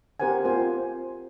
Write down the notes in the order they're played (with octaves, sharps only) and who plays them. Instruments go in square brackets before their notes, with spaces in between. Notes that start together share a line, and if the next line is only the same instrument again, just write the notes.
[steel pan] C4 G4 A#4 C5 F#5 G#5
C4 F4 C5 G#5